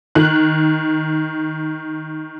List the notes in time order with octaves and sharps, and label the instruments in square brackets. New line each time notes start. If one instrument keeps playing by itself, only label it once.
[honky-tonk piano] D#3 F#6